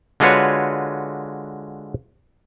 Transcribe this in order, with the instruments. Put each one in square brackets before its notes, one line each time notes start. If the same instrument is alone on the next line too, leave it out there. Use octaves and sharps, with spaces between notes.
[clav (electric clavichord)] D3 G#3 F4 F#4 B4 C#5